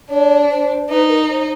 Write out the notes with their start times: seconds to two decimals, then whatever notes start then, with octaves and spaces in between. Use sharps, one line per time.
0.10 D4 C#5
0.51 C5
0.89 D#4 B4
1.09 A#4
1.29 C5